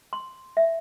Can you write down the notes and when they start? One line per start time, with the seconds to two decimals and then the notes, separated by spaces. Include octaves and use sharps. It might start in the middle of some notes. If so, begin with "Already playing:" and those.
0.13 C6
0.57 E5